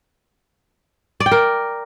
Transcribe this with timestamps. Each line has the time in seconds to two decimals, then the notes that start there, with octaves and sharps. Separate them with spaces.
1.20 D5
1.26 G5
1.31 A#4